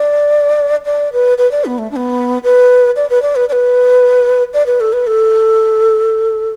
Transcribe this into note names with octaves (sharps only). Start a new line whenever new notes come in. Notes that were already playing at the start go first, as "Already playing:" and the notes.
Already playing: D5
D5
B4
B4
D5
B3
A3
D4
B3
B4
D5
B4
D5
B4
D5
B4
D5
B4
A4
B4
A4